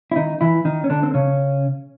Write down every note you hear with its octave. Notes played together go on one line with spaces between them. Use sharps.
E4
D#3 D#4
E3 E4
D#3 D#4
C#4
D3 D4
C4
C#3 C#4